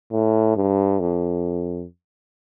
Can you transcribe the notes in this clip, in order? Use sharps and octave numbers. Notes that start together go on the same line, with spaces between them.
A2
G2
F2